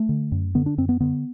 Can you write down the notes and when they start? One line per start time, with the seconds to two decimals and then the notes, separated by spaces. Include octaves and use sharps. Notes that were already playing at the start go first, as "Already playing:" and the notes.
Already playing: A3
0.09 D3
0.32 F#2
0.55 D3 B3
0.66 D4
0.78 F#2 C4
0.89 B3
1.00 D3 B3